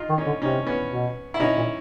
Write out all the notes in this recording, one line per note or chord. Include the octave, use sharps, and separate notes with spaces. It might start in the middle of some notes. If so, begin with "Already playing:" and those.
Already playing: D#4 F4
D#3
C#4 D#4
D3
C3 C#4 D#4
B3 C#4
B2
E4
B2 C#4 D#4
A#2